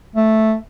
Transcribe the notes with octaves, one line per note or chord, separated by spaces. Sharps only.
A3